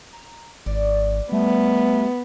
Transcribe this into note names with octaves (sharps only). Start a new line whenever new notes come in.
A#5
G#1 D5
G3 A3 B3